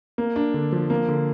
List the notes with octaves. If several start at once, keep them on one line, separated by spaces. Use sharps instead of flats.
A#3
D4
D3
F3
A#3
D3